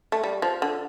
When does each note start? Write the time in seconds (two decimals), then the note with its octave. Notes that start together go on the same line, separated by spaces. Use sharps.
0.12 A3
0.24 G3
0.42 F3
0.62 D3